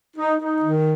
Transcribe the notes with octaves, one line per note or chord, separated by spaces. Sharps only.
D#4
D#4
D#3